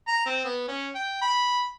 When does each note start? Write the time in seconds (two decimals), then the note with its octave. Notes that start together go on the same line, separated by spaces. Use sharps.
0.08 A#5
0.26 C4
0.45 B3
0.68 C#4
0.95 G5
1.22 B5